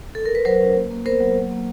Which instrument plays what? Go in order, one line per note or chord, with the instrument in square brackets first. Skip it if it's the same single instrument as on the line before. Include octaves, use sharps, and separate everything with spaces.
[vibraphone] A4
A#4
B4
F#3 A#4 C5
C#4
A#3
A#3
B3 A#4 C5
F#3
A#3
A#3